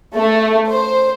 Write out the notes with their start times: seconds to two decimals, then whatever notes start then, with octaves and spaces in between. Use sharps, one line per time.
0.16 A3
0.71 C5